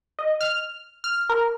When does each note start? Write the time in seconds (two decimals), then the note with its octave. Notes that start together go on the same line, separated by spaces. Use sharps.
0.19 D#5
0.41 F6
1.04 F6
1.29 A#4